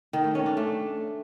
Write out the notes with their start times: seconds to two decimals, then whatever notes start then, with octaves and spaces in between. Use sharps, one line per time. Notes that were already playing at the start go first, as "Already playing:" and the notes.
0.13 D#3
0.24 A3
0.35 C#4
0.46 D4
0.57 A3